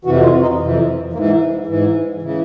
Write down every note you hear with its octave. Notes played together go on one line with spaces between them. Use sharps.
F2 C3 E3 F#4
F4
D#4
F2 C3 E3
G#2 E3 A#3
G#2 E3
C#3 E3